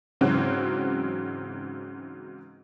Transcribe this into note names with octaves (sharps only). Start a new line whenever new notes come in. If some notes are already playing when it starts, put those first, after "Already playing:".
G#2 C#3 E3 F#3 C4 F#4